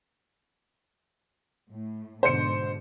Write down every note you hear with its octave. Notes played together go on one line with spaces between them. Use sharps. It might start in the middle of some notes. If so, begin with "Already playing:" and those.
A2
G#2 B2 D3 C5 C#7